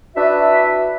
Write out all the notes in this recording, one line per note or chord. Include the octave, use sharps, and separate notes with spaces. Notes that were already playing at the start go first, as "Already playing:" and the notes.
D4 E4 F#4 B4 E5